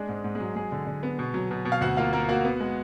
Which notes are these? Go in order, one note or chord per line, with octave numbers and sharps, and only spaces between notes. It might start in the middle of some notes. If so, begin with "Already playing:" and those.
Already playing: G#3 D4 G#4
G#2
G#2
G#3 G#4
F#3
G#3 G#4
D3
D3
B3
B2
F#3
B2
B2
F5
D2 F#4 F#5
A#3 F4 F5
A#3 A#4
A#3 F#4 F#5
B3
G#3